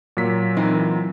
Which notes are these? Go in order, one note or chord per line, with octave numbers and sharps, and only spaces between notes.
A#2 F#3 B6
E3 C4 D#4